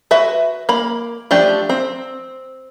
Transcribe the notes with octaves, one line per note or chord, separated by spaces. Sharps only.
F#4 B4 E5
A#3 B5
F3 A3 D4 G4
C4